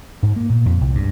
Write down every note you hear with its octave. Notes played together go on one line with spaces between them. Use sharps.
G#2
A#3
A#2
F2
C2
G2